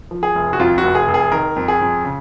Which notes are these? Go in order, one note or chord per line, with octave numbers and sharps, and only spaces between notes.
F3
G#4
F1
F#4
F2 F4
F#4
F1
G#4
F1
G#4
D#3 A#4
F2
G#4
F2
C#3